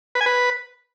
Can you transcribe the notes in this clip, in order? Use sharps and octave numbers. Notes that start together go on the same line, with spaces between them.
B4
G#5
B4